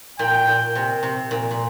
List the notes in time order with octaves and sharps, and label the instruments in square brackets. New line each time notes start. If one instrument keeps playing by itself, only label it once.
[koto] A#2 [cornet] G5
[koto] A#2
C3
C3
A#2
A#2